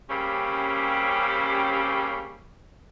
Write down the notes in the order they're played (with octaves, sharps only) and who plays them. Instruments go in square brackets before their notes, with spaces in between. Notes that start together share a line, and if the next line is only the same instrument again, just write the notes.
[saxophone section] C#3 G3 A#3 C4 C#4 G4